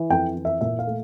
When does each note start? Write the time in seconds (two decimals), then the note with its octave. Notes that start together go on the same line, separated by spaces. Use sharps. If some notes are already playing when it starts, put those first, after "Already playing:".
Already playing: E3
0.10 F2 G5
0.35 E3
0.45 E5
0.61 A#2 E5
0.79 F5
0.87 A3